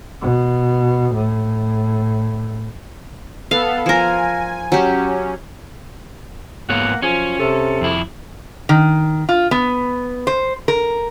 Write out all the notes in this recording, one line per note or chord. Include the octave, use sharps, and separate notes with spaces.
B2
A2
B3 A4 F5
F3 A#4 G#5
F#3 C#4 G4
G#2 A#3 B3 C#5 F#5
F#2 F3 C#4 G#5
C3 A4
F2 E4
D#3
F4
B3
C5
A#4